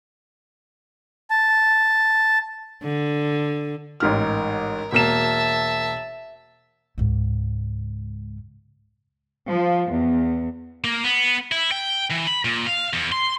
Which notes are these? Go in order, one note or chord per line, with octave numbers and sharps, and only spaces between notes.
A5
D3
A1 G#2 A#4 F6
E1 A#3 E5 A5 E7
C#2 G#2
F3
E2
A#3
B3
E4
G5
E3
B5
A#2
F5
E2
C6